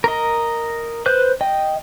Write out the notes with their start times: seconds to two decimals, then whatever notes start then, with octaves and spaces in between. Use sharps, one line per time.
0.04 A#4 D#5
1.06 B4 C5 F#6 G6
1.41 D#5 G5